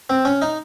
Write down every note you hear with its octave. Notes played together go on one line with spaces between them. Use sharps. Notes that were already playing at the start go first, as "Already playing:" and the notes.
C4
C#4
D#4